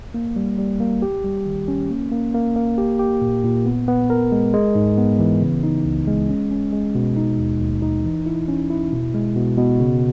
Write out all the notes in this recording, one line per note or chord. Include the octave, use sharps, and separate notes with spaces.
A#3
G3
G3
A#3
G4
G3
D#3
C#4
A#3
A#3
A#3
A#3
G4
G4
A#2
A#2
B3
B3
A#4
G#3
G#3
G#2
B3
E3
C#3
D#4
C#2
G#3
C#4
C#4
G#3
B2
D#4
D#2
D#2
D#4
E3
E4
C#4
E4
B2
G#3
B2
B2
C#3